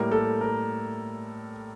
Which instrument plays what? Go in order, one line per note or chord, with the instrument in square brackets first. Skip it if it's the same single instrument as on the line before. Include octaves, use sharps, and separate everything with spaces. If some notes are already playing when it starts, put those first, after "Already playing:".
Already playing: [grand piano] A2 G3 A#3 A#4
A4
A#4